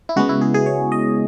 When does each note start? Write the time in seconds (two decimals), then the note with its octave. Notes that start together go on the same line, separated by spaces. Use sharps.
0.09 E4
0.16 C#3 G#3 B3 F#4
0.29 E4
0.41 G#4
0.54 G#4
0.66 C#5
0.92 D#5